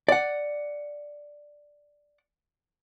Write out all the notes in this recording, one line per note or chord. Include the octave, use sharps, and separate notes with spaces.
D5 F#5